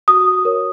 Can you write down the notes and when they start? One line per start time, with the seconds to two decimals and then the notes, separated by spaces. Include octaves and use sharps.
0.08 F#4 D#6
0.45 A#4 C#5